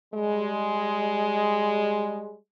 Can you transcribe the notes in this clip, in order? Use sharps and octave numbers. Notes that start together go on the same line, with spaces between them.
G3 G#3